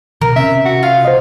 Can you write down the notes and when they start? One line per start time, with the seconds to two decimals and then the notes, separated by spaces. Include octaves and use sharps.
0.21 B2 D#3 A#4
0.36 C3 C4 C#4 E5
0.65 F#4
0.83 F4 F5
1.05 C5 D#5